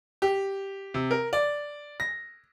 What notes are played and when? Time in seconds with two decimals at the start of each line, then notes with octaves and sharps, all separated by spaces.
0.22 G4
0.94 C3
1.11 A#4
1.33 D5
2.00 A#6